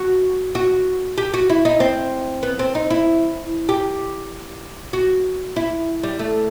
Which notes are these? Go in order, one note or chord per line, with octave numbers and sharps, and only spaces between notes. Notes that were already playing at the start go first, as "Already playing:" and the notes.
Already playing: F#4
F#4
G4
F#4
E4
D#4
C4
B3
C4
D#4
E4
G4
F#4
E4
G3
A3